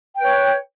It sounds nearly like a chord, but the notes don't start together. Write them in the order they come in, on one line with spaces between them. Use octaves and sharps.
G5 B4 C#5